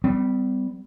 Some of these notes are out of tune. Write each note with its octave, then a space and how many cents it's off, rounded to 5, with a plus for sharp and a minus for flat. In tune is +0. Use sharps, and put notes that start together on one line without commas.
G3 +0 C4 -45